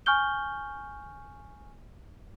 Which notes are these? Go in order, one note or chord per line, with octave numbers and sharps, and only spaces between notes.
G#5 C#6 F6 G6 G7